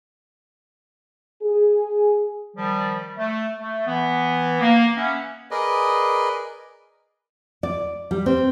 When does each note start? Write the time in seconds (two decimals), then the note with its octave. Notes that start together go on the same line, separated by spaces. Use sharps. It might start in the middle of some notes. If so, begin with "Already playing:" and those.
1.41 G#4
2.56 D#3 F3 G3
3.17 A3
3.58 A3
3.87 E3 B3
4.60 A#3
4.96 B3 C#4 E5 F#5
5.51 G#4 A#4 B4 D5 D#5
7.63 D5
8.11 G3
8.26 C4